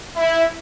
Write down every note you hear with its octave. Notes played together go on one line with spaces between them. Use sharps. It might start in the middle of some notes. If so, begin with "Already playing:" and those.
E4